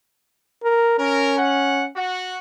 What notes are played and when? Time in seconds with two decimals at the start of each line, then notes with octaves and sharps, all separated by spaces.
0.64 A#4
0.99 C#4 A#4
1.38 F#5
1.95 F#4